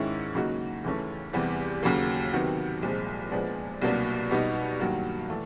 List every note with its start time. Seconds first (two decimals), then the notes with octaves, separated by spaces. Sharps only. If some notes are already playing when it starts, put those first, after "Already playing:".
Already playing: G#2 D#3 G#3 C#4 E4
0.35 C#3 F#3 A#3 D#4 F#4
0.84 D#2 C#3 E3 A3 C#4
1.33 E2 C3 E3 G3 B3
1.83 D#2 C#3 F#3 A#3
2.33 C3 D#3 F#3 B3
2.83 C2 A#2 F3 G#3
3.31 A#2 F3 G#3 B3 D4
3.82 C2 B2 F#3 A#3 D4
4.31 B2 G3 B3 D#4
4.80 G2 D#3 F#3 A#3
5.30 E3 A3